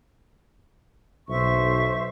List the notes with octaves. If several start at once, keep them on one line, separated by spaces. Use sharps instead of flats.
B1 C5 E5 C#6